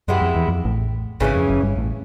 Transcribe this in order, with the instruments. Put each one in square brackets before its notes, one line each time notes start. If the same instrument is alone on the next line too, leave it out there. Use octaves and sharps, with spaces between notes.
[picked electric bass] F#2 [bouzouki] G#3 B3 E4 G4
[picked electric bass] F2
E2
F2
A1 A2
[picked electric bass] G#1 G#2 [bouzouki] C#3 E3 A3 C#4
[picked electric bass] F2
F#1 F#2
G1 G2
A1 A2